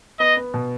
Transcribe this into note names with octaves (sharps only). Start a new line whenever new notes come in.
B3 D#5
B3
B2